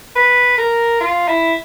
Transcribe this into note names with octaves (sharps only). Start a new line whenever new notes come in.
B4
A#4
F4
E4